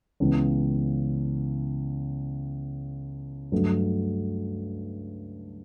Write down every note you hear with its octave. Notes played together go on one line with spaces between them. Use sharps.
C#2 C#3 E3 B3
G2 F#3 A3